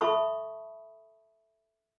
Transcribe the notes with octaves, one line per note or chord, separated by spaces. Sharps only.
A4 E5 A5 B5 C#6 D#6